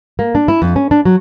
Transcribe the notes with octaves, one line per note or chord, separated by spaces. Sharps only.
A#3
D4
E4
F2
C#4
D4
F#3